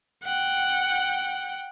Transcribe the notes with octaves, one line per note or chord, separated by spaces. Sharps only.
F#5 G5